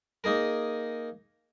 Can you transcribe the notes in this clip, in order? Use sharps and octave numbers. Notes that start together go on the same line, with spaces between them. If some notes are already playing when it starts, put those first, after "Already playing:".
A#3 D#4 G#4 A#4